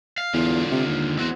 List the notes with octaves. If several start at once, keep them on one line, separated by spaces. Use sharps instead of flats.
F5
E2 D3 F4
C3
D#2
E2 C4 F#4